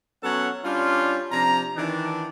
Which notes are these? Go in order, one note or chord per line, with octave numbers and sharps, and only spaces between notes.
F#3 B3 C#4 A4 C#5 F#5
G3 C#4 D4 F4
C3 F3 D4 A#5
D#3 E3 D4